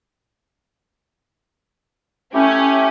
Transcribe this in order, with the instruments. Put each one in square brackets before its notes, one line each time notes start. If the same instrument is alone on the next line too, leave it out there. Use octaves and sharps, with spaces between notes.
[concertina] A3 E4 G4 [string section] C#4